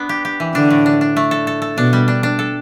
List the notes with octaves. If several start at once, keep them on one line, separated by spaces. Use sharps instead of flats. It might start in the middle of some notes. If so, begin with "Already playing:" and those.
Already playing: B3 D4
G4
G4
E3
D3 D4
A2
D4
D4
A3
A4
A4
A4
B2 D4
G3
D4
D4
A4